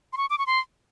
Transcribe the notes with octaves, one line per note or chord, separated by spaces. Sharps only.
C6
C#6
D6
C#6
C6